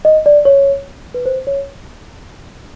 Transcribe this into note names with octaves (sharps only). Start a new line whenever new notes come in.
D#5
D5
C#5
B4
C5
C#5